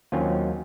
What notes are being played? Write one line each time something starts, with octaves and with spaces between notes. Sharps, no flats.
D#2 D#3 F#3 C4 C#4 F4